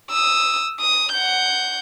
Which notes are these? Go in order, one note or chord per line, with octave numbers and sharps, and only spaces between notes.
D#6 E6
D#6
F#5 G6